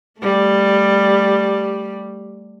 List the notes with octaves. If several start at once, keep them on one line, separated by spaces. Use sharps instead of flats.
G3 A3